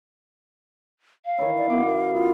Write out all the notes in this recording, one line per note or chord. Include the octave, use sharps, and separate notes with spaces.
F5
D#3 E3 E4 C#5
D5
F#2 B3 F#5 D6
A#4
B3 E4 F4